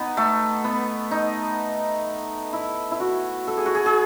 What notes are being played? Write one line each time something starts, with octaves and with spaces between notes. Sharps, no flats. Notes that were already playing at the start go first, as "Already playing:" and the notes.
Already playing: B3 D#4
A3
B3
D#4
E4
E4
F#4
A4
G#4
F#4
G#4
G#4